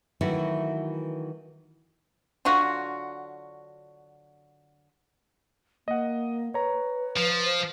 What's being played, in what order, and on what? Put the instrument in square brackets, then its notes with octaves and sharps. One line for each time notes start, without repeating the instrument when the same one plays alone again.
[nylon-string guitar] D#3 E3 F#3 A3 E4 F#4
[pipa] D3 F#3 F4 F#4
[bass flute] A#3 [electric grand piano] D#5 F#5
[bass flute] B4 [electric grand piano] C#5 A#5
[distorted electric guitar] F3
[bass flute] C5